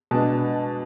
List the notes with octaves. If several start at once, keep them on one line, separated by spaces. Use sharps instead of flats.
B2 G#3 B3 D4 A5